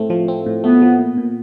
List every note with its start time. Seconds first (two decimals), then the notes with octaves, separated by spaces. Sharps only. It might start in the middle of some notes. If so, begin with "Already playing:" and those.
Already playing: A2 A3 C4
0.10 F3
0.28 C4
0.46 A2
0.64 A3 B3
0.82 F3
0.99 A#2
1.17 A#2